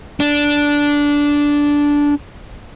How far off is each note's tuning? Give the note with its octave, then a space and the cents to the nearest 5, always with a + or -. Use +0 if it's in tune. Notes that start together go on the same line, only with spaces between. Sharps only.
D4 -10